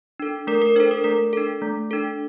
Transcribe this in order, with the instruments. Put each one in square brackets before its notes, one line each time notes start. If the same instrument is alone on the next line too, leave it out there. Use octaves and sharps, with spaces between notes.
[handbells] D4 A4
A3 A#4
A#4
D4 C5
A4
A#4
A3 A#4
D4 A4
A3
D4 A4